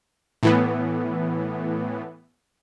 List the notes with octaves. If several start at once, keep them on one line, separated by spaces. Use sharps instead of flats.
A2 E3 B3